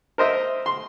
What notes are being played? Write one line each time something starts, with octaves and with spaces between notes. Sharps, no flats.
A#4 C5 D#5 E5
C6